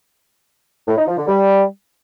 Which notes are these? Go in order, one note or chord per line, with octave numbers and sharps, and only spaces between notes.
A2
D#4
F3
D3
G3